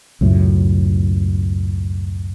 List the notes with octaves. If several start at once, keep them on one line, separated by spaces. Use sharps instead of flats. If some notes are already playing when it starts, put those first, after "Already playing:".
C#2 F#2 A2